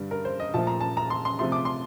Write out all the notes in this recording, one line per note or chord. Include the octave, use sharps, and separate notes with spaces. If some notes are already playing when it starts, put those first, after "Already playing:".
Already playing: G2 D3 G3
A#4
C5
D#5
A#2 F3 A3 A5
A#5
A5
A#5
C6
C6
C3 F3 A3 C6
D6
C6